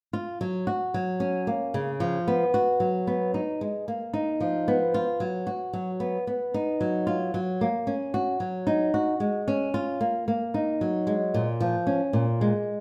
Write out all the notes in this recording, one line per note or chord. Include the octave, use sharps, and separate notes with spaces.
F4
F#3
F#4
F#3
C#4
A#3
C#3
F3
B3
F#4
F#3
B3
D#4
G#3
A#3
D#4
F3
B3
F4
F#3
F#4
F#3
B3
B3
D#4
F#3
F4
F#3
A#3
C#4
F#4
F#3
D#4
F#4
G#3
C#4
F4
A#3
A#3
D#4
F#3
G#3
A#2
F3
C#4
A#2
G#3